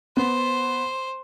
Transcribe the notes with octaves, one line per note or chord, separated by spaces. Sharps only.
B3 C5